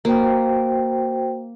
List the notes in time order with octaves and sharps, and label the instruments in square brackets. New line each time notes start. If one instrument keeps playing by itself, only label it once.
[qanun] A#3 [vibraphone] F#4 C5 G5